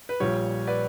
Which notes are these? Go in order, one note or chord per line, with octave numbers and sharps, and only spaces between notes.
B4
A#1 A#2 G3 C#5
B4 D5